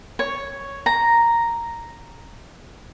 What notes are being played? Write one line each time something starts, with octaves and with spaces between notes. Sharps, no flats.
C#5
A#5